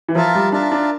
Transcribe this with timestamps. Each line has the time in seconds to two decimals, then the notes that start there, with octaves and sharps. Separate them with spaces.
0.08 E3
0.15 F3 F4 A#4 E5 A5
0.35 G3
0.52 D4 F4 A#4 E5 A5
0.71 D4